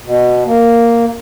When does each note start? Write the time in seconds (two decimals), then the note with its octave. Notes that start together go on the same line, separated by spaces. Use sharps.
0.06 B2
0.46 A#3